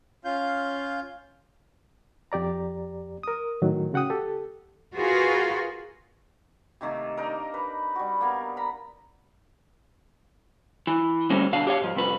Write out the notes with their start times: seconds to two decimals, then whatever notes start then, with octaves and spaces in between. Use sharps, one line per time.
0.25 C#4 F4 F5 G6
2.32 F2 G4 D5 A#5
3.23 A#4 D#6
3.62 A2 D#3 F#3
3.93 C#3 F#4 F#5 G5 D#6
4.10 G4 A4
4.94 F4 F#4 G#4 A#4 B4 F5
6.81 C3 D#3 A3 A#3
7.17 D4 D#4 A#4
7.54 B4
7.95 G3 F#4
8.21 A#3 B3 A#4
8.57 A#5 B5
10.87 E3
11.30 D2 A2 G3 A#3 C4 C#4
11.53 B2 D3 F5
11.67 G4 C#5 F5
11.82 G#2 F3
11.95 C2 F2 B4